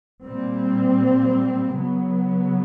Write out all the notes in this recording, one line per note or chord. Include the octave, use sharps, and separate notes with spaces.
A#2 G3 C4
C#3 F#3 B3